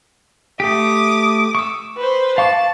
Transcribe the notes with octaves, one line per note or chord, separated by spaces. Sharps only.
A3 G4 D6 D#6
C#6 E6
B4 C5
F5 A5 C#6 D6